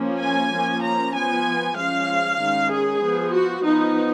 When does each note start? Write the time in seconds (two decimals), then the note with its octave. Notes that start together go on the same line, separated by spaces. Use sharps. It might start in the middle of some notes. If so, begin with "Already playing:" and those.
Already playing: F3 A#3 C#4
0.20 G#5
0.52 F3 A#3 C#4
0.83 A#5
1.14 F3 B3 G#5
1.77 F3 G#3 C#4 F5
2.39 D#3 G#3 C#4
2.71 G#4
3.02 F3 B3
3.33 F#4
3.65 F3 B3 D#4